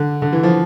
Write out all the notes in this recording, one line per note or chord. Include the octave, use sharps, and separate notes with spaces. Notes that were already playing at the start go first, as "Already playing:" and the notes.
Already playing: D3
D3
E3
F3